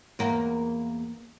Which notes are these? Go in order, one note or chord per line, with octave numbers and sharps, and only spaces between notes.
E2 A#3